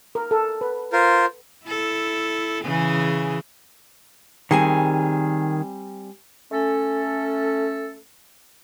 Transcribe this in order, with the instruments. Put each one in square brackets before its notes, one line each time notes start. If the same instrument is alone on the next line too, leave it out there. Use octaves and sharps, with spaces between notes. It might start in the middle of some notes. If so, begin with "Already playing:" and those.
[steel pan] A#4
A4
B4
[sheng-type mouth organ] F4 A#4 C5
[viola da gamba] E4 A4
C#3 E3 G#4
[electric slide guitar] D#3 G#4 [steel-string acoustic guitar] G3 C4 G#5
[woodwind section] A3 C#4 A4